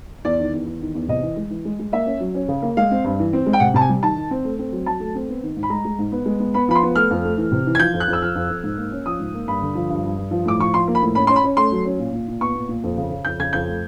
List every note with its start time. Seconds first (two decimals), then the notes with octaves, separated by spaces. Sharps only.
0.25 E2 D5
0.40 D#3
0.54 E2
0.66 E2
0.81 D#3
0.95 E2
1.08 C3 D#5
1.23 E3
1.37 G#3
1.50 E3
1.65 G#3
1.79 G#3
1.92 A#3 E5
2.06 C#4
2.20 F#3
2.34 C#4
2.48 C#3
2.62 A#3
2.77 G#3 F5
2.91 C4
3.04 G2
3.19 E3
3.33 C4
3.46 G#3
3.53 G5
3.60 C3 F#5
3.74 C3 A5
3.81 G#5
3.89 G3
4.02 D#3 A5
4.16 D#3
4.31 C4
4.45 A3
4.59 C4
4.72 F#3
4.86 F#3 A5
5.00 A3
5.15 C4
5.29 B3
5.43 D#3
5.57 G#2
5.63 B5
5.70 G#3 A#5
5.85 G#3
5.99 G#2
6.12 B3
6.26 G#3
6.40 B3
6.54 B3 B5
6.69 F3 B5
6.75 C6
6.83 B3
6.96 A3 F6
7.11 F2
7.25 A3
7.38 E3
7.52 C3
7.66 E3
7.75 G#6
7.79 F3 G6
7.94 F2
8.00 F#6
8.08 F2
8.13 E6
8.22 F3 F6
8.35 F2
8.50 F2
8.64 G#2
8.77 A#3
8.92 C#4
9.06 F3 D#6
9.20 G#2
9.34 A#3
9.48 G2 B5
9.62 D3
9.75 F3
9.89 G2
10.04 G2
10.17 G2
10.31 F3
10.46 A2 D6
10.59 F3 C#6
10.74 F3 C6
10.88 A#3
10.95 B5
11.02 A2
11.15 C#4 B5
11.27 C#4 C6
11.36 B5
11.44 C#4
11.57 A3 C6
11.72 F#3
11.85 C#4
11.99 A#2
12.13 A#2
12.28 A#2
12.41 B3 C#6
12.55 A#2
12.69 A#2
12.83 F2
12.97 C#3
13.11 C#3
13.25 F2 G6
13.40 C#3 G#6
13.53 F2 G6
13.67 A3